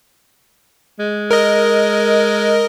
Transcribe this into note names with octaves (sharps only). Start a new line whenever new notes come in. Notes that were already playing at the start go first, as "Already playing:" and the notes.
G#3
A#4 D#5